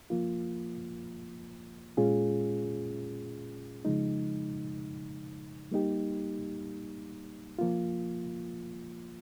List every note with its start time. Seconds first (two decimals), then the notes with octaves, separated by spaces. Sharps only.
0.10 F3 A#3 F4
1.97 A#2 G#3 C#4 F4 G#4
3.85 C#3 F3 G#3 D#4
5.72 G3 A#3 D#4 G4
7.59 F3 A#3 F4